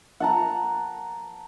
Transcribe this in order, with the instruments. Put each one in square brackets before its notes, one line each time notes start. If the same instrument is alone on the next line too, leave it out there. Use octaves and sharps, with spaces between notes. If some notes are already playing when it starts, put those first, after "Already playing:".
[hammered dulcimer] F#5 A5 A#5